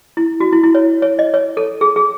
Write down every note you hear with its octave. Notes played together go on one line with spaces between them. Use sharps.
E4
F#4
E4
E4
C#5
C#5
D#5
C#5
A4
G#4
G#4